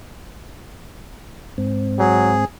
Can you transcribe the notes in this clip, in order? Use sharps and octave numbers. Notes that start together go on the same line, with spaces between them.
G#2 C4
F#3 G#4